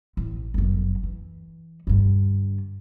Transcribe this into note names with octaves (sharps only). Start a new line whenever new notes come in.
A1
G1 F#2
E3
G2 D3